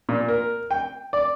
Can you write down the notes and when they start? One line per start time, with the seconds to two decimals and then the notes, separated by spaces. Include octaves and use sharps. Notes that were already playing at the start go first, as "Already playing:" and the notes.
0.09 A#2
0.28 A#4
0.71 G5
1.13 D5